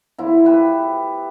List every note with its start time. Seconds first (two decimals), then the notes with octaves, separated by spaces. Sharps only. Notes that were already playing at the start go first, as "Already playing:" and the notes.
0.18 F3 B3 E4
0.45 G4 B4 E5